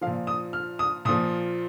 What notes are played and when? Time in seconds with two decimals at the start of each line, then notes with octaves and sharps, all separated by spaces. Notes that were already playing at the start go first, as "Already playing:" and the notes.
0.01 F3 F5
0.07 A#2
0.27 D#6
0.53 F6
0.79 D#6
1.05 A#2 F3 D#6